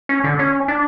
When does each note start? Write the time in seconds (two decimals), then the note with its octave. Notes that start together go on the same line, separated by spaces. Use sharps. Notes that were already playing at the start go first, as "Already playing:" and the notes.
0.09 C#4
0.24 D3
0.39 C#4
0.68 D4